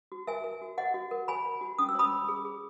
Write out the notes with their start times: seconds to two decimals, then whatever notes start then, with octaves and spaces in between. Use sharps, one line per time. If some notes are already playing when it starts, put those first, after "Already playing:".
0.12 F#4
0.27 A#4 E5 G#5
0.44 A#4
0.61 F#4
0.78 C#5 D#5 F#5
0.94 F#4
1.11 A#4
1.28 C#5 G#5 B5
1.45 C#5
1.61 F#4
1.78 C#4 D#6
1.89 E6
1.95 C#5 B5 D#6
2.12 C#5
2.28 G#4
2.45 G#4